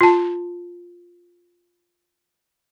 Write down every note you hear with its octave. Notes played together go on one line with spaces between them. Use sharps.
F4 A5